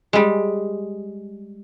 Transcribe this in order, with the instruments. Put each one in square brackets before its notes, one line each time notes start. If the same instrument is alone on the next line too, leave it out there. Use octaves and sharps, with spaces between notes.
[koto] G3 G#3